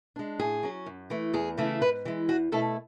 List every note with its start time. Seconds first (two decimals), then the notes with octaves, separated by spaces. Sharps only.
0.16 G#3 D4
0.39 A2 G#4
0.63 F#3 C#4
0.86 F#2
1.10 E3 A3
1.33 E2 G#4
1.58 C#3 E3 A3 E4
1.81 G#2 B4
2.05 E3 G#3
2.29 E2 F#4
2.52 B2 A3 E4 A4